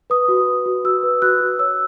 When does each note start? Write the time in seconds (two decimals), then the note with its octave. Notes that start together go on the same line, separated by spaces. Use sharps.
0.10 B4 D#6
0.28 F#4
0.47 B4
0.66 F#4
0.84 F#4 E6
1.03 B4
1.22 F#4 F#6
1.40 F#4
1.59 C#5 E6